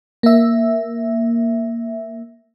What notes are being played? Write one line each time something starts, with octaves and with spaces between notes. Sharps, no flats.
A#3 E5